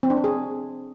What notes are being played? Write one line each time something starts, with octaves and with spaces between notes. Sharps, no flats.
C4
D4
C4
G#4